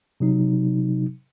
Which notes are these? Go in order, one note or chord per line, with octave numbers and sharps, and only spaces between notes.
C3 F#3 D#4